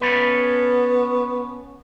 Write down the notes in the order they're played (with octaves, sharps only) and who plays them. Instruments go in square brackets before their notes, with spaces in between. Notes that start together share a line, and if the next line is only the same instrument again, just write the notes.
[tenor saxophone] B3 [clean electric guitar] C#4 A4 B4